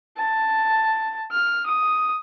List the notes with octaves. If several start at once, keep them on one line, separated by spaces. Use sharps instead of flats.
A5
F6
D#6